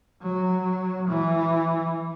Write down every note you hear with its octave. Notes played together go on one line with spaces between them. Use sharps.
F#3
E3